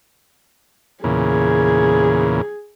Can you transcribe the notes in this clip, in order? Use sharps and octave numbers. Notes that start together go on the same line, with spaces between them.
E2 A#2 C#3 G#4